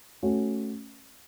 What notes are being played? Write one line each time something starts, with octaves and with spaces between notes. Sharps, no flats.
A3 C#4 F#4